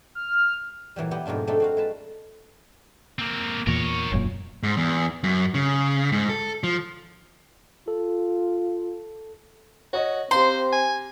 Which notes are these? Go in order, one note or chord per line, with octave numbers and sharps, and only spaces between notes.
F6
A#2 E3 F#3 G3
F#3 B3 E4 G4
F2 G#2 B2 D4 F4
A3 C4 D4 D#4 A4
C4 F#4 F5
G#3 B4 A5
A#3 C4
E2 A#2 A#4 C#5
E1 F#2 A#2
G#2
E2
F#2
C#3
G#2
A4
F3
F4 A4
F#4 C#5 D#5
C4 G4 C5 F5 A#5 C6
G#5